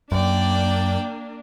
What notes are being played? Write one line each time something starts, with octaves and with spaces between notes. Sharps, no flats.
F#2 A#3 D4 D5 G5